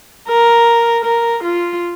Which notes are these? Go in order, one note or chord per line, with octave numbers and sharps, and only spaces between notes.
A#4
A#4
F4